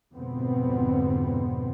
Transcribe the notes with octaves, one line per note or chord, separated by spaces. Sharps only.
F2 G#2 B2 D3 B3 C4